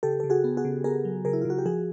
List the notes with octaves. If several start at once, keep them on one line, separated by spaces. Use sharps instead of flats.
C#3 G4 A4
C#3 A4
F#4 G#4
B3
F#4 G#4
C#3
B3 G#4 A#4
F#3
C#3 G#4 A#4
E4
F4
C#3 F#4
G4
F3 F#4 G#4